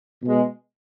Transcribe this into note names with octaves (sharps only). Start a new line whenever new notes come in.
B2 G#3